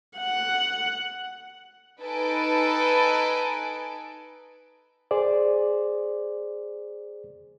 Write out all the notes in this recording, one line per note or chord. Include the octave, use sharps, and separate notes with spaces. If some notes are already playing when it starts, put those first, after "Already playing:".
F#5
D#4 A4 B4 G#5 A5 D7
G#4 C5 D5